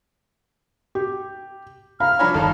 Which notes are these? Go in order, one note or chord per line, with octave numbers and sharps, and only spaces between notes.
G4
F5 A#5 B5 F6
F3 D4 C#5 G#5 A#5 B5
G1 D#3 F5 A5